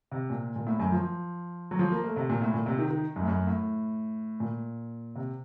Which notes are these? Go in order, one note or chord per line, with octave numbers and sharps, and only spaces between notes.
C3
A#2
A#2
A2
F#2
F3
F#3
F3
A#3
A3
C3
A#2
A2
A#2
C3
D#3
D#3
F#2
A2
F#2
A2
A#2
C3